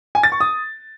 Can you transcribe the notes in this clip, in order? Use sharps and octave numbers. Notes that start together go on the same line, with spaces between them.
G#5
A6
C#6
D#6